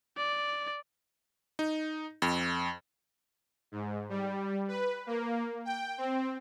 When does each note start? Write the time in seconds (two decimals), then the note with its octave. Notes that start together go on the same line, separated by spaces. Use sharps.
0.17 D5
1.59 D#4
2.22 F2
3.72 G#2
4.09 G3
4.68 B4
5.07 A#3
5.65 G5
5.98 C4